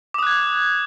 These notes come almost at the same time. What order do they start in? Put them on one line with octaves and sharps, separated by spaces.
D6 D#6 F#6 G#6